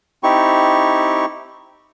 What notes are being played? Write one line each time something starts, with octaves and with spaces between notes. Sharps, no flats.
C4 D#4 E4 G4 C#6